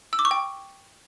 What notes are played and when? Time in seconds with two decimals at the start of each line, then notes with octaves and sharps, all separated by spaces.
0.13 E6
0.19 D6
0.25 C#6
0.31 G5